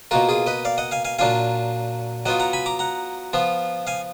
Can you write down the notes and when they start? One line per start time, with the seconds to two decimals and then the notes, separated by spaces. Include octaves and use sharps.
0.11 B2 A#3 F4 F#4 A#4
0.29 F4 G#4
0.47 B4 D#5
0.65 D5 F5
0.78 D#5 F#5
0.92 F5 G#5
1.05 F5 G#5
1.19 A#2 F#3 D4 F4 F5 G#5
2.26 F#3 B3 F4 D#5 F#5
2.40 F#5 A#5
2.53 G#5 B5
2.66 A#5 D6
2.79 F#5 A#5
3.33 F3 B3 F4
3.87 F5 G#5